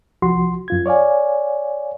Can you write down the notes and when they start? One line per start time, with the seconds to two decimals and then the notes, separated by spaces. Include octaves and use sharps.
0.22 C2 F3 F#4 C6
0.68 F#2 F4 G#6
0.86 C#5 D5 F5 G#5